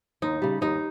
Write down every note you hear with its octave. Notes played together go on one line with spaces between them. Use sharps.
D#2 D#4
C#3 G3
D#2 D#4